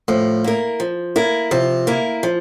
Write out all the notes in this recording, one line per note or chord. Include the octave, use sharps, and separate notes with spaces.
A2 F3
A#3 E4 A#4
F3
A#3 E4 A#4
C3 F3
A#3 E4 A#4
F3